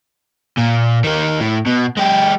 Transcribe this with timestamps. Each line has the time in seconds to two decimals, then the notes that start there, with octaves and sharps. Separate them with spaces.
0.57 A#2
1.04 D#3 A#3
1.40 A2
1.66 B2
1.97 G#3 G4